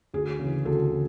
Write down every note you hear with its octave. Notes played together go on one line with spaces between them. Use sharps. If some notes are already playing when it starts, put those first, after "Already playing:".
D2 G#4
C#3 E3
D2 A4
C#3